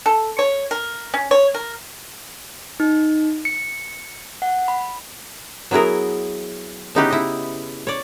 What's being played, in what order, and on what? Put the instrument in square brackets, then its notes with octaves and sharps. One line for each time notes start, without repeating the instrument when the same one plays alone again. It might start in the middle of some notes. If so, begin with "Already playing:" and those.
[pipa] A4
C#5
A#4
C#4
C#5
A#4
[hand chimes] D#4
C#7
F#5
B5
[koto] F#3 B3 E4 G#4 A#4
C#3 B3 D#4 E4 G4 B4
E4 D#5
C#5 D5